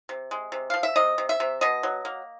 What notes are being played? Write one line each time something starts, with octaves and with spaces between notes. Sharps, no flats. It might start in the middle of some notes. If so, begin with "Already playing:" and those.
C3
G#3
C3
F3 F5
E5
C3 D#5
C3
E5
C3
B2 D#5
F#3
A#3